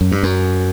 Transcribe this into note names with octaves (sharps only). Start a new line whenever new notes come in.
F#2
G2
F#2